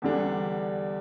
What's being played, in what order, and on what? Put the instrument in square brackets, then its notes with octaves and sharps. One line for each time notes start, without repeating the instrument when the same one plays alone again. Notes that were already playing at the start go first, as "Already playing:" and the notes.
[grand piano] E2 D3 G3 D4